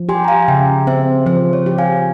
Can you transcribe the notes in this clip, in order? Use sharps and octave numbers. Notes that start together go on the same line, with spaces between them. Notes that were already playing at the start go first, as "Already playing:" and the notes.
Already playing: F3
G4 G#5 C6
A#5
F5 G#5
C#3 E5 G5
C4 C5 E5
F3 C5
C#5
G4
F5 G#5